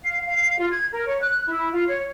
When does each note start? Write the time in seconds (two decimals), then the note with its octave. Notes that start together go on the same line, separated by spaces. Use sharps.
0.02 F5
0.26 F5
0.58 F4
0.70 G#6
0.91 A#4
1.06 C#5
1.21 F#6
1.46 E4
1.72 F4
1.87 C#5